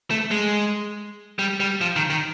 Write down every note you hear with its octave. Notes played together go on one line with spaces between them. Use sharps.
A3
G#3
G3
G3
F3
D#3
D#3